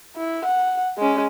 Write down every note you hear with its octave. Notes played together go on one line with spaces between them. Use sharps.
E4
F#5
G#3 C#4